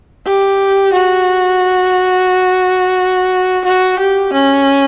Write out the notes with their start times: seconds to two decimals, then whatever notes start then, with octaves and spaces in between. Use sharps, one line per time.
0.26 G4
0.93 F#4
3.65 F#4
3.99 G4
4.33 C#4